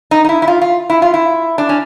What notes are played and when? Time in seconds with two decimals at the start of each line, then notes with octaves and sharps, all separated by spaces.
0.11 D#4
0.25 D#4
0.29 E4
0.42 E4
0.48 F4
0.62 F4
0.90 E4
1.02 F4
1.14 E4
1.58 D4
1.69 C#4